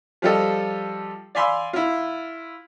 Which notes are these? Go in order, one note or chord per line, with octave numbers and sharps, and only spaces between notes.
F3 G3 F4 G4 A4 D#5
D5 F5 G#5 B5 C6 E6
E4 F4